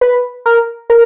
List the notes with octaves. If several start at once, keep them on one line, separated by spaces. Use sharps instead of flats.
B4
A#4
A#4